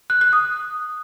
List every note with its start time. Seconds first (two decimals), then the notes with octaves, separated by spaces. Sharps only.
0.10 F#6
0.21 F#6
0.33 D#6